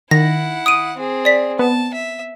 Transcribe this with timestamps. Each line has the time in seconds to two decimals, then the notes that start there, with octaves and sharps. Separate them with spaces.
0.11 D#3 E4 F#5 A#6
0.66 D#6 D7 D#7
0.97 C4 G#4
1.25 D5 B6
1.59 B3 A5
1.94 E5